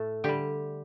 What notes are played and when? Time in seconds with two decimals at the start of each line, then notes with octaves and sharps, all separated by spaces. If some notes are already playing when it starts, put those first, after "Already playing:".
Already playing: A2 A3 A4
0.24 D3 G3 G4